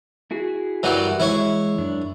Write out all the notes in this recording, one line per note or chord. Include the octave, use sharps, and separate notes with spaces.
E4 F#4 G#4
G2 E3 F#3 G3 A#4 D5
E3 G#3 E4 C#5
F#2 D4